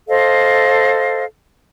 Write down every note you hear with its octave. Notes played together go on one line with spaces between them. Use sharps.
A4 C5 D#5 F5